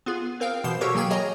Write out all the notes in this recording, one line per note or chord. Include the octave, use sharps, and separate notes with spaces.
B3 F4 G#4
C4 A#4 F5 G5
B2 E3 C5 C7 E7
F#4 G4 A4 A#4 C#5 C#6
F#3 A#3 G#4 G5 G#6
G#4 C#5 D#5 G#5 A#5